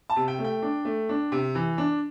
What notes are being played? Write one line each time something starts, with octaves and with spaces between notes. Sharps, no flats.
A5
C3
G5
A3
G5
D4
A3
D4
C3
E3
D4